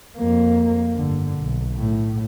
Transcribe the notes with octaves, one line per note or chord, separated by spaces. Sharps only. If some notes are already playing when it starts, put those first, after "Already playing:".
F2 A#3
G1 D3
B1
A2